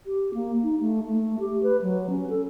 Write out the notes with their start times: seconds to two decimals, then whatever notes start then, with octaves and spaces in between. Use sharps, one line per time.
0.06 G4
0.34 A#3
0.63 D#4
0.80 A3
1.09 A3
1.40 G4
1.63 B4
1.82 F#3
2.10 C#4
2.30 A4